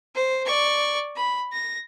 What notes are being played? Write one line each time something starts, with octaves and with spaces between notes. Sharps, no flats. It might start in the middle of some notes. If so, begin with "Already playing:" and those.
C5
D5 C#6
B5
A#6